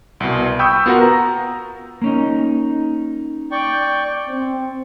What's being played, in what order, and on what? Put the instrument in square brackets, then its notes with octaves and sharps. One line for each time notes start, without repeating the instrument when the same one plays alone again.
[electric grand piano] C2 B2
G5 B5 C#6 D#6 E6 G6
B3 F4 F#4 A#4 F#5
A#5
[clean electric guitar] A#3 C#4 D#4
[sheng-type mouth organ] D5 G5 C#6
[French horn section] C4